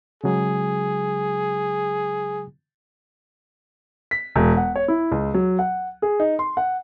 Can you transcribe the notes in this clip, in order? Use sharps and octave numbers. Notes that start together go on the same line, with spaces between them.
C#3 F#3 G#3 G#4
B6
E1
F#5
C#5
E4
C#2
F#3
F#5
G#4
D#4
C6
F#5